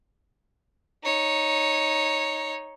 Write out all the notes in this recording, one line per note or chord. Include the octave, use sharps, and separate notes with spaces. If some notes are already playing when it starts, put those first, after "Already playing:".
D#4 C#5